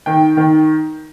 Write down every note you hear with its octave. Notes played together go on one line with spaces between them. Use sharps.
D#3 G5
D#3